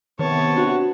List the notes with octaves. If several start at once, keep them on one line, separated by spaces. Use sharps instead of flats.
C3 D#3 B3 C#5 A5
D4 F#4